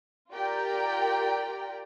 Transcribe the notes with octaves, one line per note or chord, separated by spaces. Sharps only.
F4 G4 A#4 D5 G5 A#5